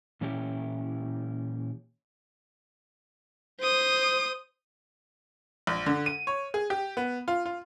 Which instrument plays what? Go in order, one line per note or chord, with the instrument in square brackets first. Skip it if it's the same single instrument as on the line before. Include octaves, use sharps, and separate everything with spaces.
[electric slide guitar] A#2 E3 C#4 E4 G4
[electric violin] C5 D#6
[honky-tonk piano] A#1
D3
D#7
C#5
G#4
G4
B3
F4
F4